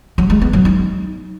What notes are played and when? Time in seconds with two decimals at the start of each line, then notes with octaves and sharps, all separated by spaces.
0.18 F#3
0.30 G#3
0.42 B3
0.53 F#3
0.65 D#4